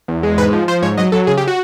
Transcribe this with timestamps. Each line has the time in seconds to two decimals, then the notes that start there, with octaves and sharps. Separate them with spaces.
0.08 E2
0.23 G#3
0.38 G#2 B4
0.53 F3
0.68 F3 C5
0.82 G#2 C#5
0.98 F#3 D#5
1.12 F#3 A4
1.27 C#3 G#4
1.37 G4
1.47 F#4